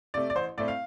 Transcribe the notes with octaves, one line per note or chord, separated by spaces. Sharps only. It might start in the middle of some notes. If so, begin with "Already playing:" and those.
C3 A3 D5
D5
A1 C5
A2 A3 C4 D5
F5